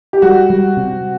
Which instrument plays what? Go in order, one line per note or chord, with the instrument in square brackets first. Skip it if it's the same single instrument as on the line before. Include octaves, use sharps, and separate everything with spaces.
[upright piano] G4
[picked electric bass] G3 [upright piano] F#4
[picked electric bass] G3
C3